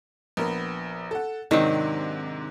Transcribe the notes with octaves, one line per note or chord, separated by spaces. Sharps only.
A#1 B3 A#4
A4 F#5
G#2 C3 D#3 F#3 C4 D4